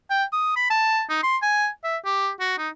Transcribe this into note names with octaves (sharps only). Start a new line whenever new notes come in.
G5
D#6
B5
A5
D#4
C6
G#5
E5
G4
F#4
D#4